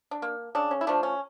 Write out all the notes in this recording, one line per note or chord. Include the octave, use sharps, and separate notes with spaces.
D4
A#3
C#3 D4
C#4
E4
F3 A3 D4
C#4